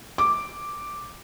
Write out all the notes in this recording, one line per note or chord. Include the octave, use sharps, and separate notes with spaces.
D6